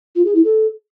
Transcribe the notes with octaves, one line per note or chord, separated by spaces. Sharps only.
F4
G#4
E4
A4